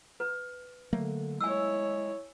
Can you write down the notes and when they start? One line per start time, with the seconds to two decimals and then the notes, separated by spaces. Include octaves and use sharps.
0.20 B4
0.93 D3 F#3 A3 A#3
1.41 G#3 E4 C#5 G#5 E6